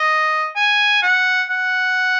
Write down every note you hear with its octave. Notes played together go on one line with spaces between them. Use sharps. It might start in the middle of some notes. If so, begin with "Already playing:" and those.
Already playing: D#5
G#5
F#5
F#5